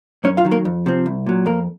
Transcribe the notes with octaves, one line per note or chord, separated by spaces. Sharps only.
F#2 C#4 C#5
F4 F5
D#3 F#3
A#3 A#4
F2
C3 F3 C4
C2
A#2 F#3
F2 A#3 A#4